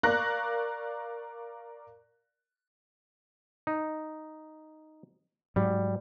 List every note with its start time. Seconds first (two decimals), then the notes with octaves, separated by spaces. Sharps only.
0.03 A#4 D5 F5 C#6 F#6 A#6
3.67 D#4
5.56 G#2 F#3 G3